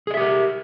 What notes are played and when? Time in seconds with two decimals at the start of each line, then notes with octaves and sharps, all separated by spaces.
0.07 G#4
0.11 D#5
0.14 E5
0.17 G4
0.21 A#4